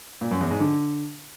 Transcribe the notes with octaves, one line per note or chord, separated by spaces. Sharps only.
A#2
F#2
E2
G#2
D3